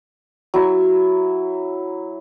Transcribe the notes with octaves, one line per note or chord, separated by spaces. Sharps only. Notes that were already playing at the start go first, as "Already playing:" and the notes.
F#3 E4 E5